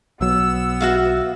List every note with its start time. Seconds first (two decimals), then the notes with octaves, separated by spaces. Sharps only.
0.21 B1 F#3 B3 E6
0.81 F#4 E5 F5